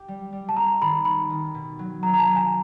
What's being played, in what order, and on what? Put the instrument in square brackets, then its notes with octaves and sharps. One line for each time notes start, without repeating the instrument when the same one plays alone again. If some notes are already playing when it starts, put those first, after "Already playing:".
Already playing: [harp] G4
G3
G3
[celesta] A5
[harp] C4 [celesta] A#5
[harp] D#3 [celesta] B5
[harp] D#3 [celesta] B5
[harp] D#3
B2
F#3
[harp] F#3 [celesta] A#5
[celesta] A#5
A5
[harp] F#3
[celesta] G#5